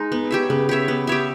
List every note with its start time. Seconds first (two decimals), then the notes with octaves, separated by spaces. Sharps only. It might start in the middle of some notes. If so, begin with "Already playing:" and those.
Already playing: G#3 D#4
0.12 B3
0.31 G4 C#5 E5
0.50 C#3 B3
0.69 G4 C#5 E5
0.88 B3
1.07 G4 C#5 E5